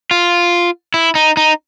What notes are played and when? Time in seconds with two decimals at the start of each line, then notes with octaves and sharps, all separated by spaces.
0.11 F4
0.94 E4
1.15 D#4
1.37 D#4